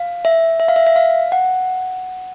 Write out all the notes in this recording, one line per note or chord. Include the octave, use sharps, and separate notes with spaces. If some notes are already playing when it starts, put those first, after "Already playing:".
Already playing: F5
E5
E5
F5
E5
E5
F5
F#5